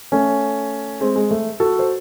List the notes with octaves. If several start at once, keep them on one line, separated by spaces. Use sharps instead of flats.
A3 C#4
G#3 C4
G#3
A3
F#4 A4
C5